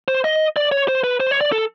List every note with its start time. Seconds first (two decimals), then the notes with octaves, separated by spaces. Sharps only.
0.08 C5
0.24 D#5
0.56 D5
0.72 C#5
0.88 C5
1.04 B4
1.20 C5
1.31 C#5
1.41 D5
1.52 A4